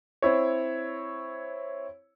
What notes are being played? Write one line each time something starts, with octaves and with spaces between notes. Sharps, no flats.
C4 E4 C#5